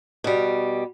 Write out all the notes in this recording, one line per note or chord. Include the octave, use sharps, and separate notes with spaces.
B2 G3